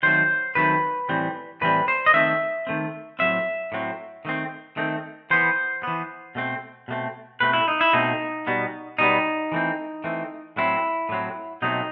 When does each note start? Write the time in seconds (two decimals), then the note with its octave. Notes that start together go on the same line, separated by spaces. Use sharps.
0.03 D#3 F#3 A3 C4 C5
0.55 D#3 F#3 A3 C4 B4
1.09 A2 E3 G3 C4
1.61 A2 E3 G3 C4 B4
1.88 C5
2.06 D#5
2.14 D#3 A3 C4 E5
2.67 D#3 A3 C4
3.19 A2 F#3 C4 E5
3.72 A2 F#3 C4
4.25 D#3 A3 C4
4.77 D#3 A3 C4
5.30 E3 B3 C5
5.83 E3 B3
6.35 B2 A3 C4
6.88 B2 A3 C4
7.40 B2 A3 C4 B4
7.53 E4
7.68 D#4
7.81 E4
7.93 B2 A3 C4 D#4
8.47 B2 G3 B3
8.99 B2 G3 B3 D#4
9.52 E3 A3 C4
10.04 E3 A3 C4
10.56 A2 F#3 C4 E4
11.09 A2 F#3 C4
11.62 B2 F#3 A3 C4 D#4